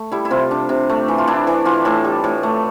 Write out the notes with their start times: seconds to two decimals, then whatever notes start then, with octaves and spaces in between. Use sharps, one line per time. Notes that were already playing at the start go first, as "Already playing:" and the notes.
Already playing: A3
0.12 G3 E4
0.25 E4
0.30 C3 F4
0.51 D4
0.69 C3
0.89 A3
1.08 E3
1.18 F4
1.27 D4 E4
1.47 E3
1.65 E3 F4
1.85 A2 A4
2.04 G3
2.24 A2
2.43 A3